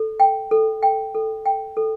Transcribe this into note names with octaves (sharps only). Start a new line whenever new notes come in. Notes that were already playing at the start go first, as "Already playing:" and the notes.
Already playing: A4
G5
A4
G5
A4
G5
A4